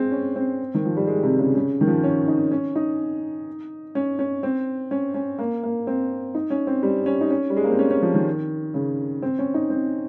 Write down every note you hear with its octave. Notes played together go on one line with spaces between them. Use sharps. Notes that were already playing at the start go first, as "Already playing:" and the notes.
Already playing: G#3 C4
C#4
C4
D#3
F3
G3
G#3
C3
C#3
C#3
D#3
F3
C#4
D#4
C#4
D#4
C#4
C#4
C4
C#4
C#4
A#3
A#3
C4
D#4
C#4
C4
G3
C#4
D#4
C#4
G3
G#3
A#3
C4
C#4
C#4
F3
D#3
C#3
C4
C#4
D#4
C4